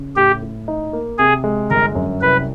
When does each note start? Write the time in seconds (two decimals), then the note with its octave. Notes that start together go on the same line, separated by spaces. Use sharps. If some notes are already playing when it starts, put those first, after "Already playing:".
Already playing: C#3
0.16 A2 G4
0.42 A2
0.68 D#4
0.93 A#3
1.18 C3 G#4
1.44 G#3
1.70 G1 A#4
1.95 F#2
2.21 C2 B4